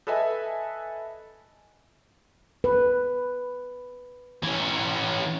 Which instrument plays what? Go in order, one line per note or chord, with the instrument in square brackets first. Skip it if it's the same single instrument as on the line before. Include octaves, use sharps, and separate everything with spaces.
[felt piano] A4 B4 D#5 E5 G#5
[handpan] B4
[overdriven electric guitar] E3 C#4